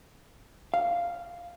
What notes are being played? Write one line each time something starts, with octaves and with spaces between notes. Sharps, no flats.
F5